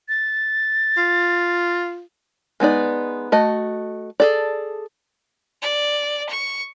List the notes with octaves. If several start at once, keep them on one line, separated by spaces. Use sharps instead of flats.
A6
F4
G#3 B3 D#4 D5
A3 F#4 D#5
G#4 A4 D5
D5
C#6